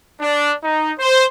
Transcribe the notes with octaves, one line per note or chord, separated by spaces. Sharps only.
D4
D#4
C5